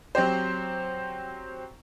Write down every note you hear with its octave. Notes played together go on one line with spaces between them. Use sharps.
F#3 C4 G4 C5